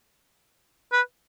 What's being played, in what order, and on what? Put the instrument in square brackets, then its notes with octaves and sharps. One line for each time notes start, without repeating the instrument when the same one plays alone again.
[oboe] B4